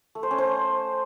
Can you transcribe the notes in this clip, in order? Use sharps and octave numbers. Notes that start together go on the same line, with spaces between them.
A3
C5
C#4
C5